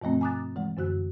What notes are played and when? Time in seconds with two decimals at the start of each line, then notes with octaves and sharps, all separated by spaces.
0.02 G2 B2 F3 A3 C4
0.21 G#5 A#5 D6 D#6 F#6 A6
0.56 E3 G#3
0.77 F#2 D3 F#4 F#6